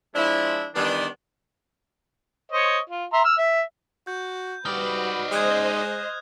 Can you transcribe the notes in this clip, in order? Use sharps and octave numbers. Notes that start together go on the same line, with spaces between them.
F3 G#3 D4 E4
D#3 E3 G3 B3 D4
C5 C#5 D#5
F4
E5 A#5 C6
E6 F6
E5
F#4 G6
G3 D#4 F#4 B4 D5 F6
G#3 C5 D#5 D#6 F#6 G#6